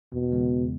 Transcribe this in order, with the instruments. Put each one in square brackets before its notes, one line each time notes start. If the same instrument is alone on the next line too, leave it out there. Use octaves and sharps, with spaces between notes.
[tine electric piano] E2 [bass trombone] B2
[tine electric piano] C#3 E3 G#3 B3
E2